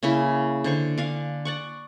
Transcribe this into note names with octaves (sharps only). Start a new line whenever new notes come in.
C#3 A#3 C#4 E4
D3 C5 C#6
D4 F5 G#5
D5 F#5 C#6